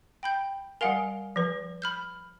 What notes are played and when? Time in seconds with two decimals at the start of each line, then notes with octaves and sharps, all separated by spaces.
0.23 G5 B5 G6
0.81 G3 A#4 F5 F#5 G#5
1.36 F3 B4
1.82 B5 F6 G6